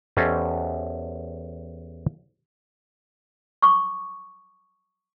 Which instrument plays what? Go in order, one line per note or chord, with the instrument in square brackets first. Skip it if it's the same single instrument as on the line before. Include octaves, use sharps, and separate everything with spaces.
[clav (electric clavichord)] E2 C#4 G4 A4 C5 D#5
[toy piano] C#6 D6